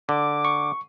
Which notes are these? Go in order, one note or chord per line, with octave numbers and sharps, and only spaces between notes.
D3 D6
C#6